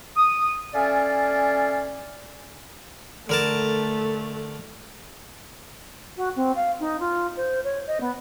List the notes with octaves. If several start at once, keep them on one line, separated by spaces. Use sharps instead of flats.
D#6
C#4 A4 D5 E5 F5 G#5
D3 A3 A#4 A5
F#4
C4
F5
D#4
F4
C5
C#5
D#5
B3